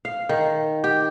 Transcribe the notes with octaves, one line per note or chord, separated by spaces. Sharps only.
F5
D#3
G4